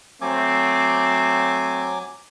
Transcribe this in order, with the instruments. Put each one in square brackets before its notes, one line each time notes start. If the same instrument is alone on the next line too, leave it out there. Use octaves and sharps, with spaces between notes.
[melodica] F#3 G#5 D6 [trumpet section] A3 C4